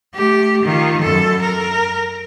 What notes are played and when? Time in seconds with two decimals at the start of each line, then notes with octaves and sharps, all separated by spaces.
0.15 A3 G4
0.62 D#3 F4
1.01 F#2 A4
1.42 A#4